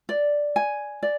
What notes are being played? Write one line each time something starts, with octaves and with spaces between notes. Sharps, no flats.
D5
G#5
D5